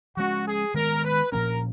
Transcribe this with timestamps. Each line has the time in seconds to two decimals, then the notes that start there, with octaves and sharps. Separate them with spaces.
0.16 F3 G#3 C#4 F#4
0.46 G#4
0.74 D#3 G#3 B3 A#4
1.04 B4
1.32 A#2 F3 A#3 C#4 A#4